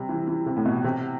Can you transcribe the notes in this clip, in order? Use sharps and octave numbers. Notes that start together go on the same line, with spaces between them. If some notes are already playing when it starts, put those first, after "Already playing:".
Already playing: C3 G3
E3
E3
C3
A2
B2
C3